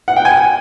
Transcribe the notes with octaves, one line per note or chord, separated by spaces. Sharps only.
F#5
G5
G#5